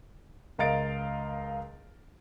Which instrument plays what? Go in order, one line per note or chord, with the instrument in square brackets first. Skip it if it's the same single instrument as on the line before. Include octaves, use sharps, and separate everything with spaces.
[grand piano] C#2 A#4 D#5 F5 A6 D7